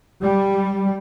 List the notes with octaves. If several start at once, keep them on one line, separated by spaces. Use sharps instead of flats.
G3